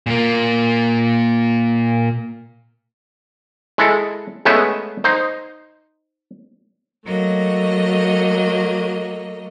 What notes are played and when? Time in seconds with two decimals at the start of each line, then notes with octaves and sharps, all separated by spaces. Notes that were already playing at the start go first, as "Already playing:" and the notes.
0.06 A#2 A#3
3.78 G#3 E4 A4
4.45 G#3 A3 B3 C#4 E5
5.04 D#4 C5
7.05 F#3 A3 A#3 D#5